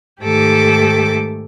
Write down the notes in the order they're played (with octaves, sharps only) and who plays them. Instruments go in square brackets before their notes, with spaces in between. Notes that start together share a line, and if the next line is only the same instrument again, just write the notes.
[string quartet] G#2 D#3 A3 G4 A4 D6